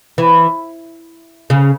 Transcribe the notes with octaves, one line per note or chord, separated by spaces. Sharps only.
E3
C#3